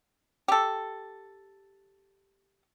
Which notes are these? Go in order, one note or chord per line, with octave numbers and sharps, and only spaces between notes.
G4 A4